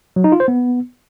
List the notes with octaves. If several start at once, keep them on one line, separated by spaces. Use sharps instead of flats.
F#3
D#4
F4
C5
B3